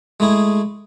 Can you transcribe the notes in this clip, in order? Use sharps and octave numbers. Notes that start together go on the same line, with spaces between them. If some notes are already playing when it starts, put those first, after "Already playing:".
G#3 A3 E4 G#4